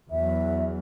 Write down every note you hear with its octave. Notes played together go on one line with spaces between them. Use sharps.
E2 F#3 E5